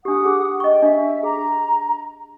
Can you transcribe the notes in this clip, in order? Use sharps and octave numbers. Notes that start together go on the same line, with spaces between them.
D4 G4 F#5 D#6
G4 G#4
D#5 G5 C#6
D4 E5
G#4 A#5